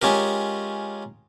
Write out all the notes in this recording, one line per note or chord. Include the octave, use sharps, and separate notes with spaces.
G#3 C#4 F4 G4 A#4